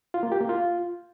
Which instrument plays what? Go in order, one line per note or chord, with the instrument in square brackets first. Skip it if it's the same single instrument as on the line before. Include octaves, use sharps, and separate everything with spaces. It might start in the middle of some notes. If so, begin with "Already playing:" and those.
[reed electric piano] F4
A#3
G4
A#3
F4